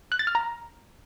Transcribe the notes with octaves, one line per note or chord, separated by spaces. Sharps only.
F#6
A6
F6
A#5